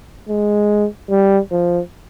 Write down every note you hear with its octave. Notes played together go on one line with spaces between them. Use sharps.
G#3
G3
F3